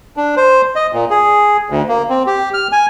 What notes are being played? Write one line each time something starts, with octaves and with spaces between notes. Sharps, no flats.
D4
C5
D#5
A#2
G#4
D2
A#3
C4
G4
F6
G#5